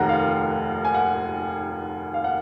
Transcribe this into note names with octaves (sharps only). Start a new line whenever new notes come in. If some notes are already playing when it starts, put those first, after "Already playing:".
Already playing: F1 D#2 D#3 F#5 A#5
F5
G#5
F#5
F5
F#5